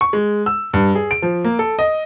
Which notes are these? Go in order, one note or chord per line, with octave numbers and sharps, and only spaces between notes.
C#6
G#3
E6
G2
G#4
D7
F3
A#3
A4
D#5